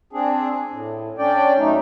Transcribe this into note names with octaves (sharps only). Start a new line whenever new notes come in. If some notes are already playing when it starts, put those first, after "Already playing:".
C4 D4 G#4
A2
C#4 D4 D5 G5
F#2 A3 D#4